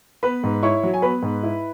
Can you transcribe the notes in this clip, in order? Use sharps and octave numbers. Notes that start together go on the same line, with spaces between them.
B3 B4 B5
G#2
E4 C#5 C#6
F#3
G#5
B3 B4 B5
G#2
E4